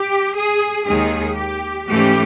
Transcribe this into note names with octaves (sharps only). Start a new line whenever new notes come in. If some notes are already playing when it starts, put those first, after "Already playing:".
Already playing: G4
G#4
D#2 D#3 G#3 G#4
G4
G#2 E3 A3 C#4 G4